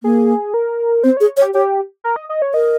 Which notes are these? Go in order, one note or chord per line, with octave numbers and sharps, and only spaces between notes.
A#3 G#4
A#4
C4 C5
G#4 C#5
C#5
G4
G4 C#5
A#4
D#5
D#5
C#5
A#4 D#5